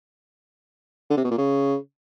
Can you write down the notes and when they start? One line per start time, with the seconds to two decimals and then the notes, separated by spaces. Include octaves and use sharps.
1.10 D3
1.17 C3
1.24 B2
1.31 A#2
1.38 C#3